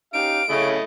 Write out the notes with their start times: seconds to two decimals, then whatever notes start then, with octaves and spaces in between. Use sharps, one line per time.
0.14 C#4 D#4 G4 F5 D7
0.50 C#3 A3 C#4 E4 D#5